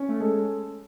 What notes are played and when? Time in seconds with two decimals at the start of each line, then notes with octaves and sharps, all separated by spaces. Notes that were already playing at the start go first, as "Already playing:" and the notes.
Already playing: C#4
0.09 A3
0.20 G#3 A4